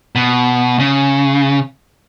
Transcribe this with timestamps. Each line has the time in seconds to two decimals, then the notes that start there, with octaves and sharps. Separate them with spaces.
0.15 B2
0.79 C#3